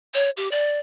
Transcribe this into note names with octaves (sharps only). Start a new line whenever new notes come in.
C#5
G4
D5